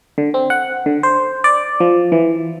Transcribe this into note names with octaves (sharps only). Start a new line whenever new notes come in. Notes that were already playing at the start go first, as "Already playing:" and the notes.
D3
C4
F#5
D3
C5
D5
F3
E3